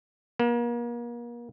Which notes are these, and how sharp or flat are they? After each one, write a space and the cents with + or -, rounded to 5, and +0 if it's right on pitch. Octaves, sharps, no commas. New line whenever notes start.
A#3 +35